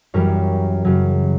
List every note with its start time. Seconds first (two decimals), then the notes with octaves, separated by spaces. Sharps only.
0.14 F#2 E3 G3 A#4 C#5
0.85 F#2 C#3 F#3